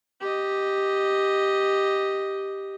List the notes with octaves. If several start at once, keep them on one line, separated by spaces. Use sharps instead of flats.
G4 D#5